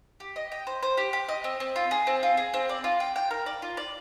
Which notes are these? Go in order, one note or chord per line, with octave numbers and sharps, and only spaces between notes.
G4
D#5
G5
C5
C5
G4
G4
D#5
C4
C4
F4
G#4
C4
F4
G#4
C4
D5
F4
G5
G5
A#4
D5
F4
D5